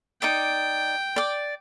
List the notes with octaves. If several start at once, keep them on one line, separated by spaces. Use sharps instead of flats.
D#4 D5 G5 D6
D5 D6